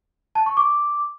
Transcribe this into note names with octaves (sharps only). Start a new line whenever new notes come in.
A5
C#6
D6